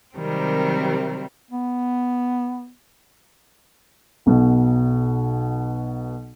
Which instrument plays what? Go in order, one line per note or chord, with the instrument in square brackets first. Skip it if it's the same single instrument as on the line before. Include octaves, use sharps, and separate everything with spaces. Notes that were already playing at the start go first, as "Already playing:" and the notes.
[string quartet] C3 D#3 F#3 G3 C4 A#4
[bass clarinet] B3
[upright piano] B1 B2